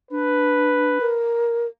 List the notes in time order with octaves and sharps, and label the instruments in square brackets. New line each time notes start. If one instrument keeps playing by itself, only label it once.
[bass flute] D4 [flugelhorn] B4
[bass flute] A#4